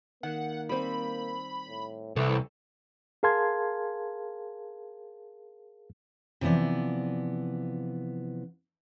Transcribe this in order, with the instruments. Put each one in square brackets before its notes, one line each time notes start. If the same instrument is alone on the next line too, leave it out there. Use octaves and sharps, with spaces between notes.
[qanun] D#3 [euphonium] A#3 [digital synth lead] F#5
[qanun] G3 C4 [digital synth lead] B5
[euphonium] A2
[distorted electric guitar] C2 [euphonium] E3 [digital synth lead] A4
[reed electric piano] G#4 A#4 F5 A5 C6 G#6
[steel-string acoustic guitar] C3 E3 F3 B3 D5